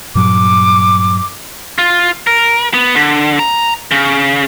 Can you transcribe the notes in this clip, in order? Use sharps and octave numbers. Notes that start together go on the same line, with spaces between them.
G2 A#2 F#3 D6
F4
A#4
B3
D3
A#5
C#3